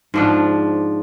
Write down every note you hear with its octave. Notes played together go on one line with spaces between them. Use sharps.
G#2 F3 D4